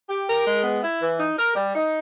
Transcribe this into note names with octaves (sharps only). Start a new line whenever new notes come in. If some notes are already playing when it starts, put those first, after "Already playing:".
G4
A#4
G#3
B3
E4
E3
D#4
A#4
G3
D#4